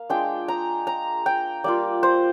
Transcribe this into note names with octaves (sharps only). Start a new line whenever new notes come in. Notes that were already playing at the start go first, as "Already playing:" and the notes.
Already playing: A#3 F5
G#3 D4 F4 G5
A#5
A#5
G5
G3 A#3 F4 D5
C5